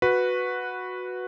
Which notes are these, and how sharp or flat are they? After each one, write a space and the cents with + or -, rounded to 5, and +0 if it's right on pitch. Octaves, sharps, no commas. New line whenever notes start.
F#4 -10 B4 +0